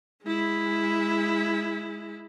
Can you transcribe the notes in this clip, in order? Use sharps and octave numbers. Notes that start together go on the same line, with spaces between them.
G#3 E4